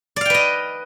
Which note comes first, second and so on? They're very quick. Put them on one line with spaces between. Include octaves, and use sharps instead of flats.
D5 F5 G5 B4 D#5